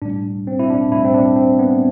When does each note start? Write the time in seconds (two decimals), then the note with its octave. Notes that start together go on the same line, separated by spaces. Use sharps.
0.02 A2 G3 D4
0.47 C4
0.59 E4
0.70 D4
0.92 A2 G3 E4
1.05 C4
1.14 D4
1.36 C4
1.59 B3